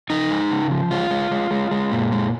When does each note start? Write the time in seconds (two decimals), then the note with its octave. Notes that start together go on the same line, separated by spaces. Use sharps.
0.10 F3 D#4
0.31 G#3
0.51 C#3
0.71 F3
0.91 G#3 F4
1.11 G#3
1.31 G#3
1.51 G#3
1.71 G#3
1.92 A#2
2.12 G#3